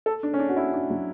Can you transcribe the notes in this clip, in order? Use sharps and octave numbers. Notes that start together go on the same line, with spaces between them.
A4
D4
C#4
D4
F#4
E4
D4
F#3